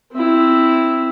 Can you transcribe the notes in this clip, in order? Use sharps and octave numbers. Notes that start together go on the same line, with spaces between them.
C4 E4